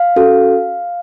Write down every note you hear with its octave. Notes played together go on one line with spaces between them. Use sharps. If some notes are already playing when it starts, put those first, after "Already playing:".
Already playing: F5
C#4 F#4 A4